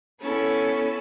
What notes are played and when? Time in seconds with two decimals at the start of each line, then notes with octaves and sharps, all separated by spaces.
0.21 B3 C#4 E4 A4